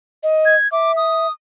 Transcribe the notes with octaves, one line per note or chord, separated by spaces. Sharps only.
D#5
G#6
E5 D6
D#6